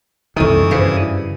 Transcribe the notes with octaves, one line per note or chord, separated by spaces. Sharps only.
C2 F#2 D#3 E3 A4 C#6 D#6
G2 C#3 B4 C5 F5